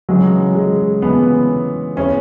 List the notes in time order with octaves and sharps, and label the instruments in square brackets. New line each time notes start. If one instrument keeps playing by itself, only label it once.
[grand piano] C#3 E3 G#3 [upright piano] F#3
[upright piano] G#3
[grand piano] C#3 E3 G#3 [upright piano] B3
[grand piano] G#3 B3 E4 G#4 [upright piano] C#4